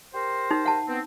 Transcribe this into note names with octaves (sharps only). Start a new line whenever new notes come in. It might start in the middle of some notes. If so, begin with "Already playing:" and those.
G4 A#4 C5
D#4
F#5 A5
B3 C4